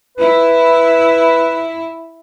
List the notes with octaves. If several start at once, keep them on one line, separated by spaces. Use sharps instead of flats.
E4 B4